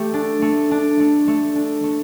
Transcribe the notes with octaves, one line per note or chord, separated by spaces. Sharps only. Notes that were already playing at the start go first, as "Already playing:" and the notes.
Already playing: A3 G4
D4
A3
D4
A3
A3
D4
A3